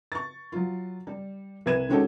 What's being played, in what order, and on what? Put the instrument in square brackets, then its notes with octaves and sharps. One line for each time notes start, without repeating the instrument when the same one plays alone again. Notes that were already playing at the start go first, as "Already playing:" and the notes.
[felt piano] C#6 A6
F#3 F4
G3
C2 B4 G#6 D#7 E7
D#3 G#3 C#4 F#4 G4 A4